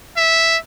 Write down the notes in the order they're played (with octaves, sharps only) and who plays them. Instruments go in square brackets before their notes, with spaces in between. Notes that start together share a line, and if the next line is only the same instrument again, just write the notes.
[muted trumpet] E5